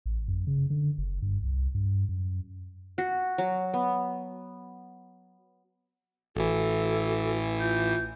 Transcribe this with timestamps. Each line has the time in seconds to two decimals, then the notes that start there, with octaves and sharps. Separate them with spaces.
0.06 A1
0.28 F#2
0.47 C#3
0.70 D3
0.98 F#1
1.22 G2
1.43 C2
1.75 G2
2.09 F#2
2.98 F#4
3.38 F#3
3.74 B3
6.36 A1 E3 F#4 A4
7.60 F4 G6